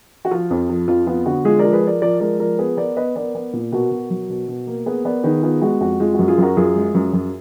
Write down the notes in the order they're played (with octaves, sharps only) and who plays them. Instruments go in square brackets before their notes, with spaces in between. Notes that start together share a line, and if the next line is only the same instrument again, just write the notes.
[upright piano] F#4
F3 F4
F2
F3
F2 F4
B3 F4
D3 F#4
G#3 F4 G#4
F3 A#4 D5
G#4 B4
F3 A#4 D5
F3 A#4 D5
G#3 A#4 D5
F3 A#4 D5
B3 G#4 B4
B3 A#4 D5
B3 B4 D#5
B3 A#4 D5
B3
A#2
B2 F#4 A#4
B2
F#3
B2
B2
A#3
B3 G#4 B4
B3 A#4 D5
D#3 G#4 B4
B3 F4 G#4
G#3 F#4
F2 F#4
G#3 F4
F#2 F#4
F4 G#4
F#2 F#4 A#4
F#2 F4 G#4
G#3
F#2
F#2